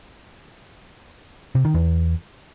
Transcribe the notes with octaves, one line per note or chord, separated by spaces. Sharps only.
C3
D#3
E2